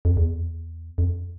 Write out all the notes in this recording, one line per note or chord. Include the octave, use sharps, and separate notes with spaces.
F2
E2
F2